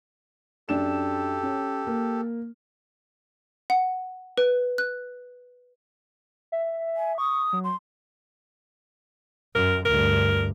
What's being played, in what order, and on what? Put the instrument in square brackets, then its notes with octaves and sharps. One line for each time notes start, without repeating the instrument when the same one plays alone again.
[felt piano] F#2 D4 E7 [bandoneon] G4 A4
[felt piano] C#4
A#3
[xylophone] F#5
B4
F#6
[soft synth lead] E5
[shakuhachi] G#5
[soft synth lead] C#6 [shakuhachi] D#6
[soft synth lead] F#3
[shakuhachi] C6
[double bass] F#2 [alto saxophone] A#4
[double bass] D2 G2 [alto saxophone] A#4